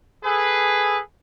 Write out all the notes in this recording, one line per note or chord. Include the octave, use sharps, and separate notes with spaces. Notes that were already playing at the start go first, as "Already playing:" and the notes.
G#4 A4 B4